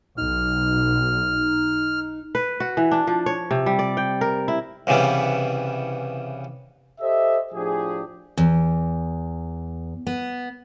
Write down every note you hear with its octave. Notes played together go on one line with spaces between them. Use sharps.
B1 D#4 F6
B4
F#4
E3
D4
F3
C#5
C3
G3
D5
G5
A#4
E4
C2 C#3 E3 G3 B3
G4 A4 C5 D#5 E5
A2 F3 D4 G4 G#4
E2
B3